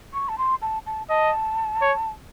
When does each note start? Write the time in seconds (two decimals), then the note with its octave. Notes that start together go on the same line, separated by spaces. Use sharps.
0.14 C#6
0.29 A5
0.38 C6
0.62 A5
0.86 A5
1.09 D#5 A5
1.82 C#5